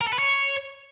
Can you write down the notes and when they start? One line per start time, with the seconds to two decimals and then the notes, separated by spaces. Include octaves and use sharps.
0.01 A#4
0.07 A4
0.13 B4
0.19 C#5